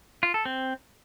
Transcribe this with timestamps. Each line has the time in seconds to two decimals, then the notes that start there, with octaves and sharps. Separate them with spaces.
0.23 F4
0.34 A4
0.45 C4